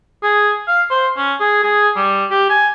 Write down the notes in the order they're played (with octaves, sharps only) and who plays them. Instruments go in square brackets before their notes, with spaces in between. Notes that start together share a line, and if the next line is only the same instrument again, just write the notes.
[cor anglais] G#4
F5
C5
C#4
G#4
G#4
G3
G4
G#5